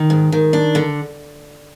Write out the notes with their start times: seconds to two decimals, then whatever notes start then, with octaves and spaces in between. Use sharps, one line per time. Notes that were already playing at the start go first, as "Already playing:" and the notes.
Already playing: D#3
0.10 G#2
0.32 D#3
0.53 D4
0.75 D3